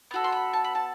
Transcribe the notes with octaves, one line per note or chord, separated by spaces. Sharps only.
B3 F#4 A4
C6
B5
A5
B5
A5